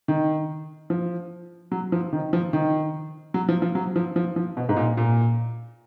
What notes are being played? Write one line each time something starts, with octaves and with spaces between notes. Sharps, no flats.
D#3
F3
F#3
F3
D#3
F3
D#3
F#3
F3
F3
F#3
F3
F3
F3
B2
G#2
A#2
A#2